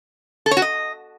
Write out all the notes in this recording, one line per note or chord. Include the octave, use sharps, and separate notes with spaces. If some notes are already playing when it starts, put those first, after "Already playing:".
A4
C#5
F#4
D#5